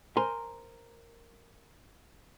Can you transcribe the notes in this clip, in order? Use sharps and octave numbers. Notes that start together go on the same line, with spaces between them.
A#4 C5 G#5 A#5 C6